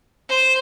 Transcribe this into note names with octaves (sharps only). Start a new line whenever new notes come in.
C5